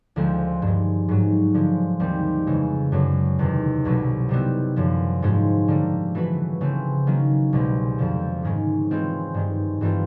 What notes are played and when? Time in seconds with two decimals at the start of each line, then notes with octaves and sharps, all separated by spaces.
0.16 D2 D3 F3 G#3 C4
0.62 G2 D#3 G#3
1.08 G#2 D#3 F#3
1.54 D3 F3 G#3
2.00 D#2 D#3 G3 C4
2.47 F2 C#3 E3 G#3
2.92 F#2 D3 F#3 A3 C#4
3.39 E2 C3 D#3
3.85 C2 B2 F#3 A3
4.29 C3 D#3 G3 B3 E4
4.76 F#2 D3 F3
5.22 G#2 F3 G#3 C#4 F#4
5.68 D3 G3 A#3 D4
6.15 E3 A3 C#4 F#4 B4
6.61 C#3 E3 A3 C4
7.07 D#3 F#3 A#3 C#4
7.53 C2 B2 G#3 C4
7.98 F2 D3 F3
8.43 G#2 D#3 G#3 C#4
8.91 E3 G#3 C4 F4
9.34 G2 D#3 G#3
9.81 G2 E3 A3 C4 F4